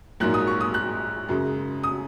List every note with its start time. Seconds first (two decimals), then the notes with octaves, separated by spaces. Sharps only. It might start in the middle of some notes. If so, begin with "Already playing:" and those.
0.20 A#1 G#2 F#3 A#3 F#6
0.34 D#6
0.47 C#6
0.61 D#6
0.74 F#6
1.29 F#2 C#3 G#3
1.84 D#6